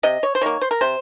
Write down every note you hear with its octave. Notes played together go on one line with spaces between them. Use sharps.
C3 D#5
C#5
C5
D#3 A#3 C#5
C5
A#4
C3 C5